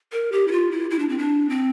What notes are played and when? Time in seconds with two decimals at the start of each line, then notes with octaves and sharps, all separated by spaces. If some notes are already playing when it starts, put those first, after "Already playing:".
0.12 A#4
0.32 G4
0.48 E4
0.52 F4
0.71 E4
0.90 E4
0.99 D4
1.09 C4
1.18 D4
1.49 C4